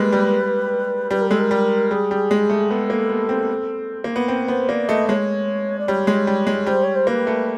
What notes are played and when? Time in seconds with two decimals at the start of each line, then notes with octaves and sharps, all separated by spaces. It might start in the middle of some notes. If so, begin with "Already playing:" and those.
Already playing: G3 G#3 A#3 B3 B4
0.12 G3
1.11 G3 B4
1.21 A#4
1.28 G#3 A4
1.39 A#4
1.51 G3
1.91 G3 G#4
2.11 G3
2.31 G#3
2.50 A3
2.70 B3 A4
2.90 A#3
3.10 B3
3.29 C4
4.04 A#3
4.16 B3
4.28 C4 B4
4.48 B3 C5
4.69 A#3 D5
4.88 A3 D#5
5.08 G#3 C#5
5.78 D5
5.88 G3 C#5
6.07 G#3
6.27 G3
6.47 G#3
6.67 G3 C5
6.83 C#5
6.95 C5
7.07 A#3 B4
7.27 A3